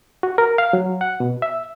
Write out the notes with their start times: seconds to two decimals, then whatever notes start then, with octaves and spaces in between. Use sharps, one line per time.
0.23 F#4
0.38 A#4
0.58 F5
0.73 F#3
1.01 F#5
1.20 B2
1.42 E5